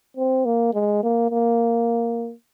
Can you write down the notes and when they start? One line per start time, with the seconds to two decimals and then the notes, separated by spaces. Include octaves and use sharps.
0.17 C4
0.46 A#3
0.74 G#3
1.03 A#3
1.31 A#3